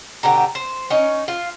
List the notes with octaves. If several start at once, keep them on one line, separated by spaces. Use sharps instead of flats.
B2 D3 G4 A#5
C5
C#4 D#4
F4